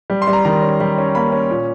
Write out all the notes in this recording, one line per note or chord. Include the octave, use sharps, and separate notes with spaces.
G3
C6
G3
A#5
D#3 A#5
C#4
G3
C#4
A#3 B5
C#4
A#2